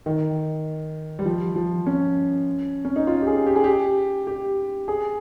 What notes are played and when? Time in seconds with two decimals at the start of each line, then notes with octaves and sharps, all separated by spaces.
0.06 D#3
1.19 G3
1.26 F3
1.56 F3
1.86 C#4
2.85 C#4
2.96 D#4
3.07 F4
3.22 G4
3.27 G#4
3.47 G4
3.56 G#4
3.64 G4
4.27 G4
4.88 G#4